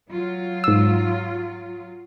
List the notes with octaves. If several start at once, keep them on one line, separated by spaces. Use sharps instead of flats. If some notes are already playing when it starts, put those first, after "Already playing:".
F#3 F4
G#2 E6